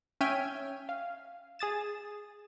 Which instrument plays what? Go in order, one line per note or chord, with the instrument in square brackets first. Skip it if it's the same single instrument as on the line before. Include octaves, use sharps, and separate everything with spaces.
[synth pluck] C#4 E5 G5 F6 G#6 D#7
F5
G#4 D#6 A6 E7